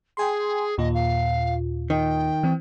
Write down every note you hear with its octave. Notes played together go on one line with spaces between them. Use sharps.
G#4 G5 G#5 C6
D#2 A#2 F4 D#5
F5
D#3 G5
E3 C4